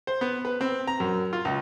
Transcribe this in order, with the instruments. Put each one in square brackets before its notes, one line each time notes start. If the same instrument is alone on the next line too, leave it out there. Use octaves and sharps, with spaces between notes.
[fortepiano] C5
B3
B4
C4
A#5
F#2
F4
C#2